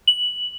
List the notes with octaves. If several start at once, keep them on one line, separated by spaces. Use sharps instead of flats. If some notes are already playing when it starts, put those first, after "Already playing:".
F#7